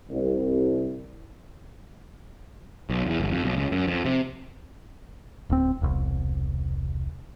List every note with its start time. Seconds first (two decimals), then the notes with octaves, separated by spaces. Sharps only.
0.10 C2
2.90 B1
3.07 E2
3.20 G1
3.31 F2
3.44 B1
3.57 C#2
3.72 F#2
3.88 F2
4.05 C3
5.50 D1 C4
5.82 E1 C2